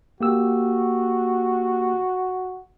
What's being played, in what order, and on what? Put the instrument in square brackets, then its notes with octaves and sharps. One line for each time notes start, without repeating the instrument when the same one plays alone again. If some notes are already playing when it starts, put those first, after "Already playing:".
[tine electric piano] A#3 G4 E6 [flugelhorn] F#4